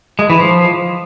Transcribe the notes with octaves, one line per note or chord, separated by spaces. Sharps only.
G#3
E3
F3